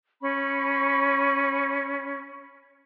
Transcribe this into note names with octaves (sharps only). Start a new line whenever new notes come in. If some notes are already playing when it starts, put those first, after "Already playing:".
C#4 B5 C#6